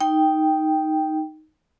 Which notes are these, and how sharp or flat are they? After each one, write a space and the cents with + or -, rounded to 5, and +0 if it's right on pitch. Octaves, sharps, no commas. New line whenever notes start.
D#4 +0 G5 +0